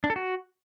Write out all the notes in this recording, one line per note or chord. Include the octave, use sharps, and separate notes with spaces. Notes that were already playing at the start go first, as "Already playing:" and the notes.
D4
A4
F#4